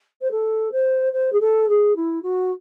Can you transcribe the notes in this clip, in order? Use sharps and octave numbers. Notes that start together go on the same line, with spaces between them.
C5
A4
C5
C5
G#4
A4
G#4
E4
F#4